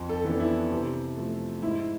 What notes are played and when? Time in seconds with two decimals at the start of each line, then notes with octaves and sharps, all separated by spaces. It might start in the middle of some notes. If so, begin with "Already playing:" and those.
Already playing: F2
0.09 A4
0.24 E3 B3 D4
0.40 E4
0.70 C3
1.16 F3 A3
1.62 G#2 E4